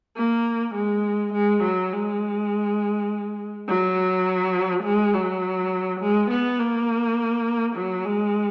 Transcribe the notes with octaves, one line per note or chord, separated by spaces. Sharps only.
A#3
G#3
G#3
F#3
G#3
F#3
G#3
F#3
G#3
B3
A#3
F#3
G#3